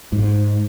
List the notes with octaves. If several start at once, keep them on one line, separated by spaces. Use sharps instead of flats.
G#2